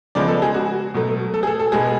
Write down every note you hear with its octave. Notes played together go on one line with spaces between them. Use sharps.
C#3 F3 G#3 B3 D5
A4
G#4
F#4
B2 F#3 A3
A4
G#4
A4
A4
B2 G#3 B3 G#4